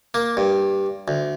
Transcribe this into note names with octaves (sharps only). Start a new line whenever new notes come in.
A#3
G2
D2